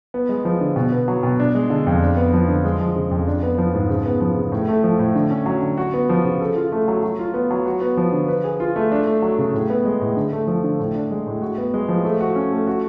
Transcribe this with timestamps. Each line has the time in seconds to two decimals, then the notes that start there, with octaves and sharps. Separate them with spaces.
0.14 B3
0.29 G#3
0.45 F3
0.61 D3
0.76 B2
0.92 B3
1.08 F#3
1.23 B2
1.40 D4
1.55 G#3
1.70 D3
1.87 F2
2.02 D4
2.17 B3
2.33 F3
2.48 D3
2.64 G#3
2.80 F3
2.96 C#3
3.11 F2
3.27 D4
3.43 B3
3.58 F3
3.74 G#2
3.90 C#3
4.06 B3
4.21 F3
4.36 C#3
4.52 A2
4.69 A3
4.84 F3
4.99 A2
5.15 D3
5.31 C#4
5.46 F#3
5.62 D3
5.78 F#4
5.93 B3
6.09 F3
6.25 C#3
6.41 A4
6.56 F4
6.72 A3
6.88 F#3
7.03 F#3
7.19 F4
7.34 B3
7.51 F#3
7.66 F#4
7.81 B3
7.97 F3
8.12 D3
8.28 B4
8.44 G#4
8.60 F4
8.76 A3
8.92 D4
9.06 A3
9.22 F#3
9.39 C#3
9.53 A2
9.70 B3
9.85 G#3
10.01 A2
10.16 D3
10.33 A3
10.47 F3
10.64 D3
10.79 A2
10.95 D4
11.11 G#3
11.27 A2
11.42 F#4
11.58 B3
11.74 G#3
11.88 F3
12.05 A3
12.21 F#4
12.36 C#4
12.52 A3
12.67 F#4